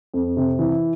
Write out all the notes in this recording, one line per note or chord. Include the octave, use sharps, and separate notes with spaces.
F2
C3
E3